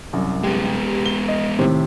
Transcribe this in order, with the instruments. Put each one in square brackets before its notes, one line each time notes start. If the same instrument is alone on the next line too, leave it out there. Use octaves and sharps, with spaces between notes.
[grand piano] C2 F#2
[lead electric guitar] G#3 B3 [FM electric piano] G4
[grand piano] G7
D#5
[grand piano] A2 C3 [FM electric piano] D#3 C4